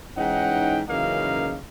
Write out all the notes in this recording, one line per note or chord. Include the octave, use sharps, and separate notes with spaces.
G#2 E3 C#4 D#4 F#5 G5
F#2 C#3 E3 A#3 D#4 F5